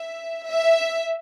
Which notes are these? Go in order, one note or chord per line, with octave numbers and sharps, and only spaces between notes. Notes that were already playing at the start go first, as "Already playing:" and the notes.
Already playing: E5
E5